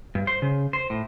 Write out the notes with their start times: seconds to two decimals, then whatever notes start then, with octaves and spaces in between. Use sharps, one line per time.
0.15 G2
0.27 C5
0.42 C#3
0.73 C5
0.90 A2